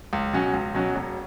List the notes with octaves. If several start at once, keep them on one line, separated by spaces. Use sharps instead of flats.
C#2
B2 F#3 C#4 F#4
C#2
B2 F#3 C#4 F#4
E1